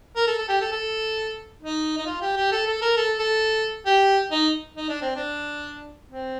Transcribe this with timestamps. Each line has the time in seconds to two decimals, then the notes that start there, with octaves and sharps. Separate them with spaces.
0.16 A#4
0.27 A4
0.38 A4
0.49 G4
0.61 A4
0.72 A4
1.62 D#4
1.98 D#4
2.06 F4
2.22 G4
2.37 G4
2.52 A4
2.67 A4
2.82 A#4
2.97 A4
3.19 A4
3.86 G4
4.31 D#4
4.76 D#4
4.89 D4
5.02 C4
5.16 D4
6.11 C4